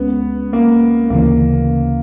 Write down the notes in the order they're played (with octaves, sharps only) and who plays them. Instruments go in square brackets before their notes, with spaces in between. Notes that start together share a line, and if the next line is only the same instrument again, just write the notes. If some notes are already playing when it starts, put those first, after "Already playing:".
Already playing: [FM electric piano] C#2 G#3 C#4 [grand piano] B3
[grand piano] A#3
[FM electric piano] D2 C#3 E3 [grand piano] A#3